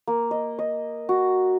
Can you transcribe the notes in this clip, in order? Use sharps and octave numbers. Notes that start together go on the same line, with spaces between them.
A#3
D#5
D#5
F#4